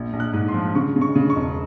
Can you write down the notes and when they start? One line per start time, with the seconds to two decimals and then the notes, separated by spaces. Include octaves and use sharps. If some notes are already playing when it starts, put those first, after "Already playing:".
Already playing: A#1
0.13 A#1
0.20 F#6
0.33 G#2
0.48 C6
0.54 F3
0.75 C#3 C#6
0.96 C#3
1.01 C#6
1.16 C#3
1.30 C#6
1.36 E1